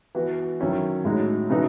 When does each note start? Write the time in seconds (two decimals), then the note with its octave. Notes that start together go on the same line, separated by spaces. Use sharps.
0.15 E3 B3 F#4
0.60 D#3 F#3 C#4 E4
1.04 A2 G#3 D#4 F#4
1.50 C#3 E3 A3 D#4 F#4